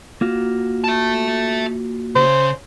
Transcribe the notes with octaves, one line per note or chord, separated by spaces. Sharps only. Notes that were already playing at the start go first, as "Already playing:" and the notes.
A#3 F4 F#4
E5 A5
C#3 C5